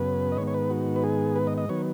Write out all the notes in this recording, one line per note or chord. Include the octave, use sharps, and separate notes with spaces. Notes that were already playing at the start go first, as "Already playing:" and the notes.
Already playing: F#2 C#3 B3 B4
D#5
G#2 D#3 B3 C#5
C#5
B4
F#4
B4
G#4
B4
D#5
D#5
D#3 F#3 B3 C#5